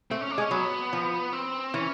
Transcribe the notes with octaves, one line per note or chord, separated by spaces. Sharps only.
A3 C4
C#4
D4
G#3
C#4
F#3 B3
F3
C4
E3 C#4